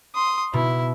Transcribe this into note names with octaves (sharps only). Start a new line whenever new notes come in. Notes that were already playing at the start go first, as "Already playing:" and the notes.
C6 D#6
B2 E4